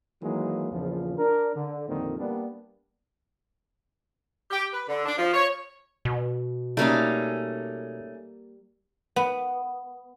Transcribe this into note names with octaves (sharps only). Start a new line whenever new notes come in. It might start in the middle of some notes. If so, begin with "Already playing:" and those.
D#3 E3 F#3 G#3 A#3
A#1 E2 C#3 F3
D4 A#4
D3
F2 A#2 D3 D#3 G3 C4
G3 A#3 B3 D4
G4
B4
D3
D4
F3
C#5
B2
G3 A3 A#3 C#4 D#4 F5
B3